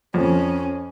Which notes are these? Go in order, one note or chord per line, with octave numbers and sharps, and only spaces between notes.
F2 C#4